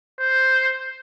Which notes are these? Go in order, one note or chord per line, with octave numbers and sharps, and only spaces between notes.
C5